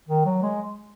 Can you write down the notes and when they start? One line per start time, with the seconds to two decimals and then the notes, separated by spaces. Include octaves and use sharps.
0.09 D#3
0.25 F#3
0.43 G#3